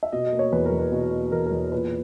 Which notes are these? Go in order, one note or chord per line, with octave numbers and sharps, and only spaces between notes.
E5
B2 D#5
D#5
A#3
C#5
E2 B4
A#4
E2
B4
B2
A#3
E2 A#4
A#4
E2
A#2 B4